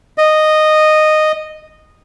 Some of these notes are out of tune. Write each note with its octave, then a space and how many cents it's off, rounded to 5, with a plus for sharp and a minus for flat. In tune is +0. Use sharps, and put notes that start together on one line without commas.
D#5 -10